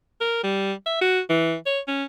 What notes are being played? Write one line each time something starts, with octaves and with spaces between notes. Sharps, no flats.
A#4
G3
E5
F#4
E3
C#5
C#4